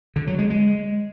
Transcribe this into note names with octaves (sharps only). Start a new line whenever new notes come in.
D3
F#3
G#3
G#3